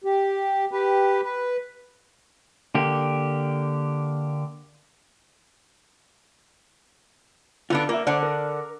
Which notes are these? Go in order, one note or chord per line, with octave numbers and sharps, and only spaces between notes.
G4
G4 B4
B4
D3 A#3 G4
D3 B3 D4 F4
A#3 A#4 E5
D3 D4 C5 D5 F#5
A#4